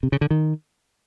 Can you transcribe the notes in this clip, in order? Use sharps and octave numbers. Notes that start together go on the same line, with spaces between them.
C3
C#3
D3
D#3